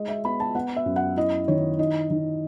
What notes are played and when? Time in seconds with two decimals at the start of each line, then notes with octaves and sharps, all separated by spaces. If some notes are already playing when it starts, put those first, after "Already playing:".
Already playing: G#3 D#5
0.09 E5
0.25 B3 B5
0.40 A5
0.55 B3 F#5
0.76 E5
0.86 F#2
0.96 F#5
1.17 E4 D#5
1.48 D#3 C#5
1.79 D#4 D#5
2.10 D#3